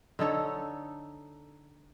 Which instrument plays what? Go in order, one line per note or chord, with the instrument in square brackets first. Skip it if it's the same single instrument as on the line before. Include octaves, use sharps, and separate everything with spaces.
[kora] D3 D#4 A4 C#5